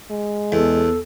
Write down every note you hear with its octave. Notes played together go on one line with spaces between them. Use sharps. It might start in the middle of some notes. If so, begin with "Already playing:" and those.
G#3
E2 A4